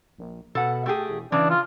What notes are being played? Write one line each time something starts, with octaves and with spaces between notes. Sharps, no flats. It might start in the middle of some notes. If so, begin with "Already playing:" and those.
A#1
B2 A4 F#5
A3 G4 G#4
E1
C#3 E3 D4
F4